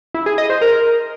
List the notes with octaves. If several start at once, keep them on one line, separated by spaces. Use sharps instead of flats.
E4
G#4
D#5
C5
A#4